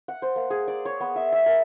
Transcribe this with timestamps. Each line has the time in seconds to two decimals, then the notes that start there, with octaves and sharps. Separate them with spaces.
0.08 F#5
0.22 C5
0.36 A#3
0.50 G#4
0.68 D5
0.85 C#5
1.00 B3
1.16 E5
1.33 E5
1.46 A#4